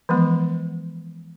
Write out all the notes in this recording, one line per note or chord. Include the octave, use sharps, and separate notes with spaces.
E3 F3 G#3 B3